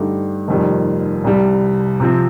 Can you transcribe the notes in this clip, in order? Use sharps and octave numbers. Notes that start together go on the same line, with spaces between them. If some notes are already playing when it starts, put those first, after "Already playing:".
Already playing: G2 D3 A3 D#4 G4
F1 F2 D#3 G3
C2 C3 G3
C3 F3 C4